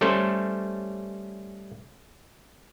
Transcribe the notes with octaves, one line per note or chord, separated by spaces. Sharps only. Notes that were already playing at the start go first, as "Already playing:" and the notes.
G3 A3 C#4 A4 C5